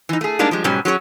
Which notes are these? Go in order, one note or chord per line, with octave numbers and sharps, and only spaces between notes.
E3 D#4
A3 G#4
G3 G#3 A#3 D4 D#4
F3 G3 G#3
G#2 B2 F#3 G3 C#4
F#3 C#4 G#4 B4 C#5